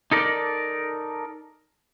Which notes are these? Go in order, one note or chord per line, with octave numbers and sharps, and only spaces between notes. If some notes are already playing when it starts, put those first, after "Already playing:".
D#4 A4 A#4 D5